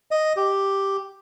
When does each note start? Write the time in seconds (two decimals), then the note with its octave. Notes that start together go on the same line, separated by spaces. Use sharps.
0.11 D#5
0.37 G4